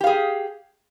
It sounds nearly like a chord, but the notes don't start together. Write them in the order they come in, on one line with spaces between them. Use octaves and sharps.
G4 F5 G#4